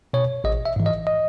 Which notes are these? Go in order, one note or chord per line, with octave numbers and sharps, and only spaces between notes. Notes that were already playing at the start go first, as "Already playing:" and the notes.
B2 C#5
A1 D#5
E5
G#2 E3
D#5
D#5